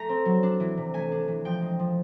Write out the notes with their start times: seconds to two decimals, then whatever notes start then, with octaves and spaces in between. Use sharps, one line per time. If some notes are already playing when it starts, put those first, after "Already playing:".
Already playing: A3 A#5
0.09 C4
0.25 F#3
0.43 D4
0.60 E3
0.77 C3
0.94 A3 G#5
1.12 D4
1.28 E3
1.45 F3 G5
1.62 G#3
1.79 F3